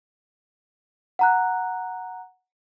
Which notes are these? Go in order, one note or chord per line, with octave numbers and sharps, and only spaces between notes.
F#5 A#5 F#6